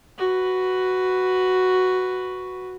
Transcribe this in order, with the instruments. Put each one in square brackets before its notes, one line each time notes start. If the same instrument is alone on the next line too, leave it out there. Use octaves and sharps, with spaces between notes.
[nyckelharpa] F#4 B4